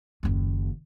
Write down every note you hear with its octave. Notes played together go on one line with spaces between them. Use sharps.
F#1 D#2